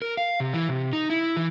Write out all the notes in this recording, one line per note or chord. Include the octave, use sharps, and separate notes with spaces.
A#4
F5
C3
E3
C3
D#4
E4
E3